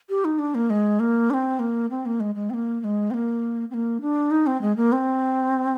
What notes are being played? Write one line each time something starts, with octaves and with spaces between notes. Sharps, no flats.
G4
D#4
D4
A#3
G#3
A#3
D4
C4
A#3
C4
A#3
G#3
G#3
C4
A#3
A#3
G#3
C4
A#3
C4
A#3
D4
D#4
C4
G#3
A#3
C4